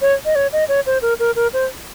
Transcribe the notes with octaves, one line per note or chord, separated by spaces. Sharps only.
C#5
D#5
C#5
D#5
C#5
C5
A#4
A#4
A#4
C5